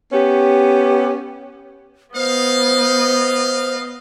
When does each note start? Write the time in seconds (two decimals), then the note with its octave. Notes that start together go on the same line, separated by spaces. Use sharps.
0.13 B3 C#4 G4
2.14 B3 C5 D#5 F5